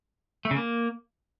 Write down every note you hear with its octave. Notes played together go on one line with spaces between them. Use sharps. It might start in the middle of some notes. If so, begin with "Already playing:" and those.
A3
C#3
A#3